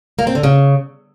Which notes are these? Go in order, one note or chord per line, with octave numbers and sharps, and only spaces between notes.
A#3
C4
D3
C#3